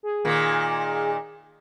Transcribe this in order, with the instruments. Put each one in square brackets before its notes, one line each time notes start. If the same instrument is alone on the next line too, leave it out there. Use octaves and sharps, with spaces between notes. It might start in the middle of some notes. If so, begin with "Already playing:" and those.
[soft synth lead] G#4
[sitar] A#2 D#3